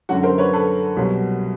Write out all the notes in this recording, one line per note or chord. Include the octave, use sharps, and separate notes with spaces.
F#2 D3 F#3 F#4
A#4 C5
B4 C#5
A4 B4
C2 B2 F#3